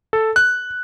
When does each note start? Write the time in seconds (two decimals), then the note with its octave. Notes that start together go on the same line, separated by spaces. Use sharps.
0.13 A4
0.36 F#6